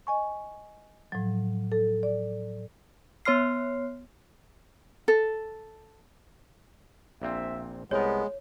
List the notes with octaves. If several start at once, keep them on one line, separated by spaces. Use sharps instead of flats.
D#5 G#5 C#6
A2 F3 F#3
A4
D5
B3 C#5 C6 F6 C7
A4
A#1 A#2 C4 E5
C2 G#3 B3 A#4 C#5